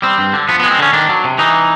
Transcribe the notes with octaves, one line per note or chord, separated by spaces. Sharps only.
G3 C4
G2
D3
F3 B3
B3
G#3
C4
D3 C#4
D#3 D4
F#3
C3
E3 D#4